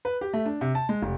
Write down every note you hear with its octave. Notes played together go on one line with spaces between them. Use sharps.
B4
G4
A3
D4
C3
A5
G#3
F1